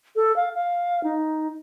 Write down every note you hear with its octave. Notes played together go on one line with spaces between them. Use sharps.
A4
F5
F5
D#4